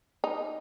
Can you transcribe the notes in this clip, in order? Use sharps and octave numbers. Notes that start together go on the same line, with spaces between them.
D#4